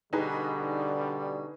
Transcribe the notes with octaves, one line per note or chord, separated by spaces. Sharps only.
B2 D3 G3 D#4 G#4 B4